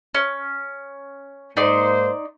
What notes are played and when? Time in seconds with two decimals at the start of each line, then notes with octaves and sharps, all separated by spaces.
0.15 C#4
1.57 G#2 A#3 D#4 C5 D5 C6